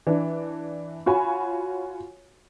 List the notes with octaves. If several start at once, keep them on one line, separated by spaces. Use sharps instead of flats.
E3 D4
F4 F#4 C#5 G#5 B5